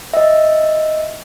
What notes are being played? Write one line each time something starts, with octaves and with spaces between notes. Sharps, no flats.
D#5 E5